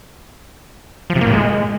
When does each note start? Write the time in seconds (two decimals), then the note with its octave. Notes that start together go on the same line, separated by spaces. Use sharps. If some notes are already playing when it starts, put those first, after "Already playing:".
1.10 F3
1.15 C3
1.21 A#3
1.27 A2
1.33 G#3